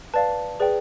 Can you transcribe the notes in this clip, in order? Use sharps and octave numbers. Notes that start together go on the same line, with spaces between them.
B4 D5 F5 A5
G#4 B4 D5 G5